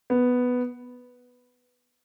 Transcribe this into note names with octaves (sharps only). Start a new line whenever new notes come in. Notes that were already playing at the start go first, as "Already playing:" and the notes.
B3